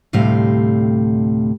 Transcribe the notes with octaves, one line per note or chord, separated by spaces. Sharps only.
D2 A2 C3 G3 F5